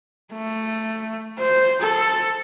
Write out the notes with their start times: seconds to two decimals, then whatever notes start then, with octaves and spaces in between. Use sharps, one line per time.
0.33 A3
1.39 C5
1.81 A4